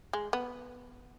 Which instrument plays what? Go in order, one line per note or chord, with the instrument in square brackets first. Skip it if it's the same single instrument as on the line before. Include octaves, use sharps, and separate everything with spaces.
[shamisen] G#3
B3